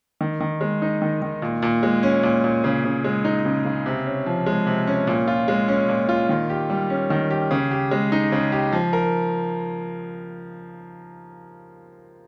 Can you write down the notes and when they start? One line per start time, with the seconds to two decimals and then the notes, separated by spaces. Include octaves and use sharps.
0.21 D#3
0.40 D#3
0.61 G#3
0.82 D#4
1.02 D#3
1.22 D#3
1.42 A#2
1.62 A#2
1.83 G#3
2.03 C#4
2.23 A#2
2.44 A#2
2.64 C#3
2.84 C#3
3.04 G#3
3.25 D#4
3.45 C#3
3.65 C#3
3.86 C3
4.06 C#4
4.26 F3
4.46 G#3
4.67 C3
4.87 C#4
5.07 A#2
5.27 F4
5.48 G#3
5.68 C#4
5.89 A#2
6.09 F4
6.29 D#3
6.50 G4
6.70 G3
6.90 C#4
7.10 D#3
7.30 G4
7.51 C#3
7.71 G4
7.91 G#3
8.12 D#4
8.32 C#3
8.52 G4
8.72 F3
8.93 A#4